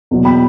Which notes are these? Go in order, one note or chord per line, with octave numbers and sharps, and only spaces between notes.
E2 B2 F#3
G5 B5